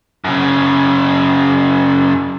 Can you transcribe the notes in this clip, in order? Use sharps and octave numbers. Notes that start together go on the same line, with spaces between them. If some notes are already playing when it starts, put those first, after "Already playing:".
F#2 C#3